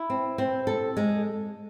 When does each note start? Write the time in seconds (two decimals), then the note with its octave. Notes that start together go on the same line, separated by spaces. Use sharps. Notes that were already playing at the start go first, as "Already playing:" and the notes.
Already playing: E4
0.10 C4
0.38 C4
0.67 A4
0.97 G#3